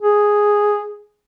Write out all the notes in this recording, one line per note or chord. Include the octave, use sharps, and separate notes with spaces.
G#4